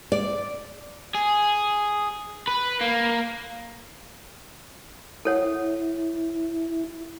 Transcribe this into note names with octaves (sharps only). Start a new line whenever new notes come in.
D5
G#4
B4
A#3
E4 A4 C#5 F#5